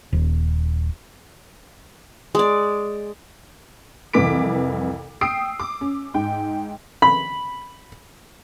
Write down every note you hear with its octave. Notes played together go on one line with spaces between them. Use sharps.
D#1
G#3 D5
C2 F2 E3 D6 B6 D7
G5 D#6 E6 C7 D7
D6
C#4
G#2 G5
B5